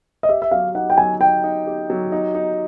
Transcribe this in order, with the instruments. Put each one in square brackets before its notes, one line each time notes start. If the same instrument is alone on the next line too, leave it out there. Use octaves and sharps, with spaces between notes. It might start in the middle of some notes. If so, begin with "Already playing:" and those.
[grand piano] D#5
[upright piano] G4 [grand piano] E5
[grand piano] E5
[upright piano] F#3 [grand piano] F5
[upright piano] D#4 [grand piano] F#5
[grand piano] G5
[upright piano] F#3 [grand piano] G#5
[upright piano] D#4 [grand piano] G5
[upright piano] D#4
G4
F#3
D#4
D#4